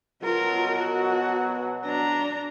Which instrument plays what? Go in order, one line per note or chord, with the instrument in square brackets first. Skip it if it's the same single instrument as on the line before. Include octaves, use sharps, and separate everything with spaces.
[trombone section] B2 F#3 [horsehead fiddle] F4 A#4
[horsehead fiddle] F#4
D4 A#5